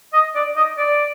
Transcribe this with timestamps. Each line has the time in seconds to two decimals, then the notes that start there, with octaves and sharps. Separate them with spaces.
0.13 D#5
0.35 D5
0.56 D#5
0.78 D5